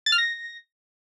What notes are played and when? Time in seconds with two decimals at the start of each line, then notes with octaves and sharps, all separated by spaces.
0.06 A6
0.12 F6
0.18 A#6